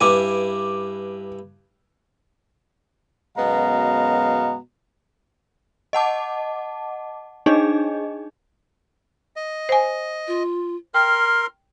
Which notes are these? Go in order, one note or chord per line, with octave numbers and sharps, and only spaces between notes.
G2 E4 B4 G#5 D6
F#2 B2 G#3 B3 F5 A#5
D#5 F#5 A5 D6
D4 D#4 G#4 D#5
D#5
C5 G#5
F4
A#4 G5 C6 F6